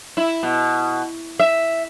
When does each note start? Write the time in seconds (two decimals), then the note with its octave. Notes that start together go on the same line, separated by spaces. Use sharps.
0.17 E4
0.43 B2
1.39 E5